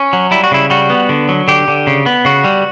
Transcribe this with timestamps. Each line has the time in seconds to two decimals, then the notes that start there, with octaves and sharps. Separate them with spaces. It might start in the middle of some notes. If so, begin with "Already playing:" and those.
Already playing: C#4
0.13 F#3
0.31 G3 E4
0.44 F#4
0.51 C#3 E4
0.70 G3 F#4
0.90 B3
1.09 D3
1.29 F#3
1.48 D3 G4
1.68 D3
1.87 C#3
2.06 B3
2.25 C#3 F#4
2.44 G3